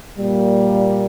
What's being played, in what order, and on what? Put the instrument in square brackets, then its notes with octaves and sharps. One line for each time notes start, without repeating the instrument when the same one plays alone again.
[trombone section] A#2 G3 A#3